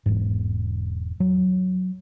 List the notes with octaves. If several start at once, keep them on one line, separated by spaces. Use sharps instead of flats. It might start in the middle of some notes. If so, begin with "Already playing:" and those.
E1 G#2
F#3